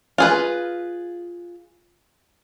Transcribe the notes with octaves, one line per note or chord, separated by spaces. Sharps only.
F4 G#4 B4